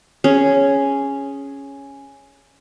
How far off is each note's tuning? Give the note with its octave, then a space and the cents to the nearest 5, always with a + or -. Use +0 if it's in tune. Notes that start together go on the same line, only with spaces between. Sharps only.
C#4 +0 G#4 +0